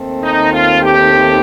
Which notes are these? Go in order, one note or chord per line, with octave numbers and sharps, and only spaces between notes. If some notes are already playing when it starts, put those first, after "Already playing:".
Already playing: D#2 D#3 A3 C4
D#4
F4
G4